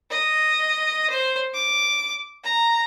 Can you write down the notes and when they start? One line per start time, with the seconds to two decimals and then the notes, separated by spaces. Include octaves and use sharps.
0.11 D#5
1.10 C5
1.54 D6
2.44 A#5